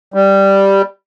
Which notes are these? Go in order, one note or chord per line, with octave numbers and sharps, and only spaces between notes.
G3